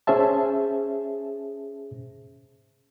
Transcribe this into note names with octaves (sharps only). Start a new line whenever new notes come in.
C#4 G#4 C5 E5 A5